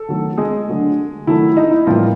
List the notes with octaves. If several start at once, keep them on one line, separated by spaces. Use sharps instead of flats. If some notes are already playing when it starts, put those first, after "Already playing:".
Already playing: A4
D#3 F#3 A3
G#3 G#4
D3 F#3 A3
D#3 F#3 A3 E4
D#4
E4
A2 E3 F3 G3 A#3 F4